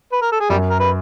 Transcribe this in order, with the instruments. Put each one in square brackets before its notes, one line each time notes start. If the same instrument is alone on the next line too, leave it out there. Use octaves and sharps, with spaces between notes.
[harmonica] B4
A#4
A4
G#4
[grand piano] F#2 [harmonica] G3 G4
[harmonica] A#4
B4